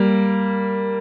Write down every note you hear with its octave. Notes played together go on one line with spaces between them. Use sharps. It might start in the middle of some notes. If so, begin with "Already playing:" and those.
Already playing: G3 A#3